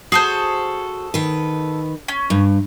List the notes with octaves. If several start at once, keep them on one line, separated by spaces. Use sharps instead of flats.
F#4 G#4 A4 C5
D#3 B4
C#4
G2